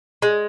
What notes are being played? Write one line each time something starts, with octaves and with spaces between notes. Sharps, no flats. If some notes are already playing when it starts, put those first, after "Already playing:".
G#3